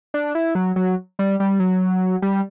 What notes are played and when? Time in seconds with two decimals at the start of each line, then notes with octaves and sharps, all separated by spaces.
0.14 D4
0.35 E4
0.55 F#3
0.76 F#3
1.19 G3
1.40 G3
1.60 F#3
2.22 G3